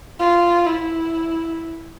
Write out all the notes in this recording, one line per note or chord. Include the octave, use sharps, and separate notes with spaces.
F4
E4